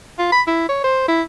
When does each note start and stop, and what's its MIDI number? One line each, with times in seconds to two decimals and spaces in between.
0.19 0.31 65
0.32 0.42 83
0.47 0.68 64
0.69 0.81 73
0.84 1.03 72
1.08 1.22 64